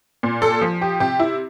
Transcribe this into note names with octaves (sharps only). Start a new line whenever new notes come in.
A#2
A4
F3
G4
C3 G4
E4